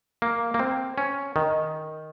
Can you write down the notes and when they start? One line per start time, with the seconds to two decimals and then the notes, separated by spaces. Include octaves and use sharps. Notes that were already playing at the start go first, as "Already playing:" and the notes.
0.22 A#3
0.54 A#3
0.59 C4
0.98 C#4
1.36 D#3